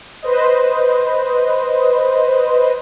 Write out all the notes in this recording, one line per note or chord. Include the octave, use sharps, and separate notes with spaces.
B4 C5 D#5